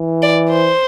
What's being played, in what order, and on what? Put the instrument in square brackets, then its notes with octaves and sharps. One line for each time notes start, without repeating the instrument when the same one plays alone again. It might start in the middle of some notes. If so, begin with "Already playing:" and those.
Already playing: [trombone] E3
[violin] D5
C5